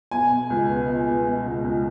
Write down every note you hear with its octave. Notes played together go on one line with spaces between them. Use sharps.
B2 G#5
B2
C#2
B3
B2
B3
B2
C#2
C#2